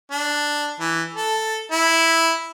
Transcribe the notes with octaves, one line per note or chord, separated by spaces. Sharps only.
D4
E3
A4
E4